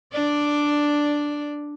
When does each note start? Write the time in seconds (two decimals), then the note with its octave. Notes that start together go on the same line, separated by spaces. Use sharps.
0.12 D4 D5